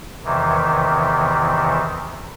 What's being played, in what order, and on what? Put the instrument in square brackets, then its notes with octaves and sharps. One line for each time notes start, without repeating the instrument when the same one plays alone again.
[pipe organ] E2 C3 D#3 E3